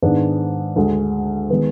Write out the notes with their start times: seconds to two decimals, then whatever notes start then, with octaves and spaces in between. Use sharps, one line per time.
0.02 G#2 D#3 G#3 B3 D4
0.76 D2 D3 G#3
1.50 D#3 G#3 B3